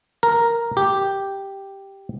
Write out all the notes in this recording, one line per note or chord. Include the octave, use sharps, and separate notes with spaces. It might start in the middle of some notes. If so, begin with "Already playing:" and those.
A#4
G4